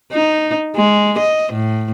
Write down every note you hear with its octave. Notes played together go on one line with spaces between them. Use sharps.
D#4
G#3
D#5
A2